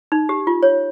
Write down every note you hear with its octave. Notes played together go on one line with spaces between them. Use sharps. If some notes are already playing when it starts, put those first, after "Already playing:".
D#4
G4
F4
C#5